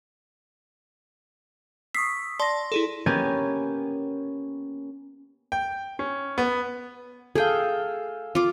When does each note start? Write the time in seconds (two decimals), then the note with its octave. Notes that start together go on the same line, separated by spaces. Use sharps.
1.95 C#6 D#6 E6 B6 C7
2.40 D5 A5 C6 A#6
2.72 E4 G#4 A4
3.06 A#3 B3 C#4 G4 A#4 G#5
5.52 G5
5.99 C#4
6.38 B3
7.36 G#4 A4 F5 G5
8.35 F4 D6